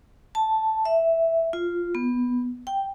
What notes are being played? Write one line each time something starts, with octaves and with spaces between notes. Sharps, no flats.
A5
E5
F4
B3
G5